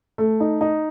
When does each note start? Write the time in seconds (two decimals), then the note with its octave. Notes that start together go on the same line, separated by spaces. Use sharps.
0.18 A3
0.40 D#4
0.61 D#4